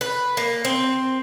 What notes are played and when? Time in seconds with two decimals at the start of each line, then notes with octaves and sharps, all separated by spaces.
0.01 B4
0.37 A#3
0.65 C4